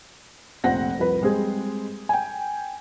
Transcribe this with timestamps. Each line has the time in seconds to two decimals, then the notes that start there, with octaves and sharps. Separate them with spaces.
0.64 F1 A#1 C4 F#5 A#6
0.99 C2 F2 B4
1.22 G3 G#3 C4 G#4
2.09 G5 G#5